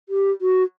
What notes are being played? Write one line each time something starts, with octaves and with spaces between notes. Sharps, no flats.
G4
F#4